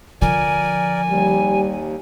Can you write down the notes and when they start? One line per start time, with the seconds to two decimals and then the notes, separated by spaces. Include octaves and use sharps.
0.22 D3 F3 A#4 D5 G#5
1.10 D#2 G3